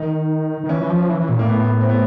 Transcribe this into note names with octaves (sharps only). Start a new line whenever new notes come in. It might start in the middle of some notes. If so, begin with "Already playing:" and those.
Already playing: D#3 D#4
D#3
E3 C#4
E3
F3
E3
E3
A#2
A2 A#3
B3
C4
B3